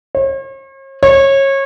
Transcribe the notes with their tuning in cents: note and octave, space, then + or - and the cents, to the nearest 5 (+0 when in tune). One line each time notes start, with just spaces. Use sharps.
C#5 -45
C#5 -25